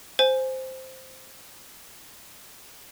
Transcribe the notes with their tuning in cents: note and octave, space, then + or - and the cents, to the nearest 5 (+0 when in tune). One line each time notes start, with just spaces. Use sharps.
C5 +0 G#5 +0